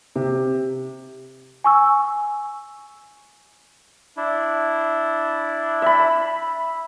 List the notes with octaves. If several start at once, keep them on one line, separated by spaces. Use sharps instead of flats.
C3
G#5 C#6 E6
D4 E4
E5 B5